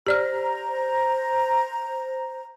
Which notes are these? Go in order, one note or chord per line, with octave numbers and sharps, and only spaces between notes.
G4 C5 D5 A#5 F6